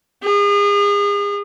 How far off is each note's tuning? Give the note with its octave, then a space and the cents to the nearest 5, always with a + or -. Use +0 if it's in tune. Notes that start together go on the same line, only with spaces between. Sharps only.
G#4 -35